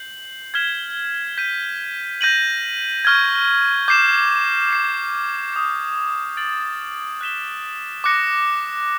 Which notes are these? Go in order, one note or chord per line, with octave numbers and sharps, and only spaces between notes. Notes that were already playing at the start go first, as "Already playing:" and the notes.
Already playing: G6 C7 F#7
F6 G#6 B6 E7 G7
G6 B6 D#7
G6 A#6 D#7 F#7
C#6 F6 G#6
D6 G6 C7 E7
G#6 C7 E7
D#6 G6 C7
F6 A6 D7 F#7
F#6 B6 E7 G7
D6 F#6 A#6 C#7